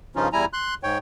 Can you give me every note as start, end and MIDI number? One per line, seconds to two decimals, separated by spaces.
0.16 0.28 43
0.16 0.28 49
0.16 0.28 53
0.16 0.28 61
0.16 0.28 63
0.16 0.28 65
0.33 0.45 40
0.33 0.45 55
0.33 0.45 64
0.33 0.45 80
0.33 0.45 82
0.53 0.74 84
0.53 0.74 90
0.83 0.98 44
0.83 0.98 73
0.83 0.98 79